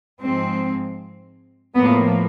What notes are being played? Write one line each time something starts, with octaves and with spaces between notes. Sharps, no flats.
G#2 F3 G#3 C4
A2 F3 A#3 B3